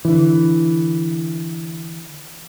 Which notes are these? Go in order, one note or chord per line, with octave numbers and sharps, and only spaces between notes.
D3 E3